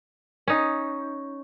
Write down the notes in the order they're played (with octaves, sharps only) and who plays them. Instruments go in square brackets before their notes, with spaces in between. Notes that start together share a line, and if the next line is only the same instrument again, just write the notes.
[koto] C#4 D#4